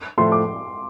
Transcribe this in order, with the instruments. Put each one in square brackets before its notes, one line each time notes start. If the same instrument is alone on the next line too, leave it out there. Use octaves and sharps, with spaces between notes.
[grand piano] A2 F3 A3 [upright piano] C6
[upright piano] D6